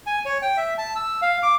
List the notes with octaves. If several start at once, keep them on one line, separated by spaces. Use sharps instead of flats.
G#5
C#5
G5
E5
A5
E6
F5
D6